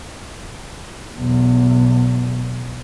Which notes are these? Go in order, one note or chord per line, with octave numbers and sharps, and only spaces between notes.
B1 E2